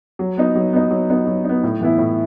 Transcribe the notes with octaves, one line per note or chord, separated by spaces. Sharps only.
F#3
B3 D#4
F#3
B3 D#4
F#3
B3 D#4
F#3
B3 D#4
A2
E3 B3 E4
A2